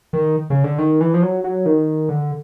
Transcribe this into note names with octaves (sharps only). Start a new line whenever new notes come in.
D#3
C#3
D3
D#3
E3
F3
F#3
F#3
D#3
D3